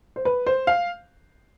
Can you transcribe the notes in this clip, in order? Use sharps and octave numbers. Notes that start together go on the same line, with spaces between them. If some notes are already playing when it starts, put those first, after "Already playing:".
C5
B4
C5
F5